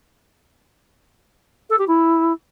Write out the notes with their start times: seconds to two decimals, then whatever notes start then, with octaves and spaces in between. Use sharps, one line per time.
1.70 A4
1.79 G4
1.87 E4